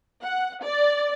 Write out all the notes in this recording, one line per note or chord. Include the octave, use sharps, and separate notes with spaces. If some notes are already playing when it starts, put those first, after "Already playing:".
F#5
D5